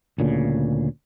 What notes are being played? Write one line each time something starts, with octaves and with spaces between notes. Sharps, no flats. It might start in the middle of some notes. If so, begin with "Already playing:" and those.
D2 A#2 C#3